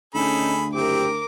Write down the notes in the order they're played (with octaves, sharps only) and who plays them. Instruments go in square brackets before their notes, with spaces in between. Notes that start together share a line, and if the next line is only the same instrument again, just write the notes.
[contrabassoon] D2 [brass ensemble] C#4 D#4 [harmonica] G#4 A4 B5
[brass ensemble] F#1 E4 G4 [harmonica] C4 [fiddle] A#4 D6